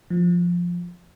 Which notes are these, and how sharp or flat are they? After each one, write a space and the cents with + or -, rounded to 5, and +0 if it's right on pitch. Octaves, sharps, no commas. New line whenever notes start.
F3 +5